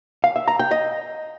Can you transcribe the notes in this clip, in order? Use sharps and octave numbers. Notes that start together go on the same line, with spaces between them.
F5
E5
A#5
G5
D#5